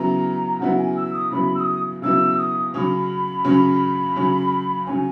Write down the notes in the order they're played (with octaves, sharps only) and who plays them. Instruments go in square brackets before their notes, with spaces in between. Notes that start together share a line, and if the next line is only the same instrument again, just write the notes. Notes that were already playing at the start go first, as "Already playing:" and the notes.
Already playing: [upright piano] C#3 F#3 B3 E4 [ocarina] A#5
[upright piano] C#3 F#3 B3 E4 [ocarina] F#5
[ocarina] G#5
E6
D#6
[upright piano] C#3 F#3 B3 E4 [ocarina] B5
[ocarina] E6
D#6
[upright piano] C#3 F#3 B3 E4 [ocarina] E6
[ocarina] D#6
[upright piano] C#3 F#3 C#4 [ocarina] B5 D#6
[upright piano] C#3 F#3 C#4
C#3 F#3 C#4
[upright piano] C#3 F#3 C#4 [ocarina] G#5